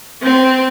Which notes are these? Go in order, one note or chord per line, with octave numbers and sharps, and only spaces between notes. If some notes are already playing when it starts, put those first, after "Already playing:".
C4